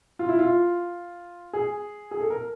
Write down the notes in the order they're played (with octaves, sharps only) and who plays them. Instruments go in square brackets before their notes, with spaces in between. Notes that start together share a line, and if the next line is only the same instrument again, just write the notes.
[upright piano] F4
E4
F4
G#4
G#4
A4
A#4